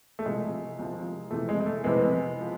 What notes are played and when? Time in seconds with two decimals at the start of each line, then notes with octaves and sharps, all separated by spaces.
0.19 A3
0.25 C2 C3 F3 G#3
0.79 C2 C3 F3
1.31 F2 C3 E3 A3
1.49 G#3
1.60 G#3
1.66 A3
1.84 F2 C3 E3 G#3 B3
2.41 F3